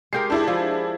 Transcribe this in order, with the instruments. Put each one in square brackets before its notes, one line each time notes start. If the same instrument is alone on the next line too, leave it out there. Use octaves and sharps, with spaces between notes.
[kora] G#3 G4 A#4 [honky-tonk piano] G6 C7
[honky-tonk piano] D4 E4 G#4
[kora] F3